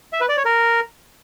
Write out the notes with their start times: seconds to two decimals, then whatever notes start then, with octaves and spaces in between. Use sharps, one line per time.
0.13 E5
0.21 B4
0.29 D5
0.37 C#5
0.45 A#4